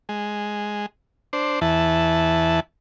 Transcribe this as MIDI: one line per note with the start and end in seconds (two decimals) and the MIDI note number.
0.09 0.86 56
1.33 1.60 62
1.33 1.60 72
1.61 2.60 40
1.61 2.60 52
1.61 2.60 81